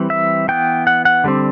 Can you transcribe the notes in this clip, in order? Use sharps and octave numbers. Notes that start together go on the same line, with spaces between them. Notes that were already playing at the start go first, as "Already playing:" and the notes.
Already playing: E3 G3 C4
E5
E3 B3 G5
F#5
F#5
D3 G3 C4